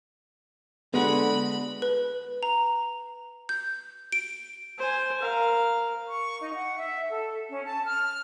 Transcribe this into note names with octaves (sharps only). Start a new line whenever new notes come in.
D3 G#3 B3 F#4 F#5 B5
B4
A#5
G6
D7
C5 G#5
A#4 F5
C#6
D#4
F#5
E5
A4
C#4
A5
F6